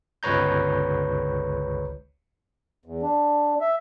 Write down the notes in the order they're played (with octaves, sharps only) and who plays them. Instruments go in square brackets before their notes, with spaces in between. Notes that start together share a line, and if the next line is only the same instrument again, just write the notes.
[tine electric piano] G1 C#2 B4 C#5 A#5 G6
[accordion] E2
D4
E5